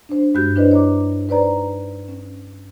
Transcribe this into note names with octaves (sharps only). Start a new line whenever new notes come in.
D4 C5
G2 G#3 F#4 G4 F#6 G6
D4 E4 B4 C5 D5 D#5
C#5 A#5 D6
D#4 B4 C5 D5 A#5
C#4